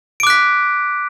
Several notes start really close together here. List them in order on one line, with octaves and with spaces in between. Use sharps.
D7 D6 F#6 B6